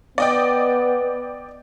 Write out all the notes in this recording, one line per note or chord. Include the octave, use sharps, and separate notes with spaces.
B3 D5 D#5 G5